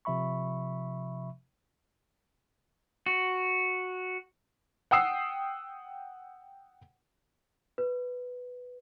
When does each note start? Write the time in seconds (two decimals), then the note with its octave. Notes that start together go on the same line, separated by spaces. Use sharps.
0.05 C3 F3 E5 B5 C#6
3.06 F#4
4.91 F#5 G5 D#6 E6 C7
7.78 B4